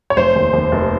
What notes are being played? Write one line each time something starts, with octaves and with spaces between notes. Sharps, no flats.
C#5
F1 C5
D#2
D#2
F1